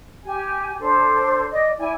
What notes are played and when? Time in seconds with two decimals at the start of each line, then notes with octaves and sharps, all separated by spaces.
0.25 G4 G#5
0.80 D4 A4 C5
1.51 D5 D#5
1.78 E4 D5 G#5